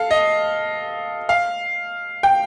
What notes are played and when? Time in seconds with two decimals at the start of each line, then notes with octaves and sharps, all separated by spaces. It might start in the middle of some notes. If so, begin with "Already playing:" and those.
Already playing: A4 F5
0.11 D#5
1.29 F5
2.23 G5